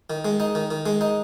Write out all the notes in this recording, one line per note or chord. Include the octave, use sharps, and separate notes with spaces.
D#3
G#3
D#4
D#3
D#3
G#3
D#4